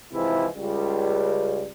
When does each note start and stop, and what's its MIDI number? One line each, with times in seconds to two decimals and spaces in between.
0.13 0.47 44
0.13 0.47 48
0.13 0.47 52
0.13 0.47 53
0.13 0.47 56
0.13 0.47 64
0.56 1.66 37
0.56 1.66 55